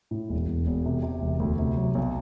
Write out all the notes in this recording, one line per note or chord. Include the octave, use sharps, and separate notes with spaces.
A2
E1
E1
E1
C3
C3
E1
D2
C3
F#3
B1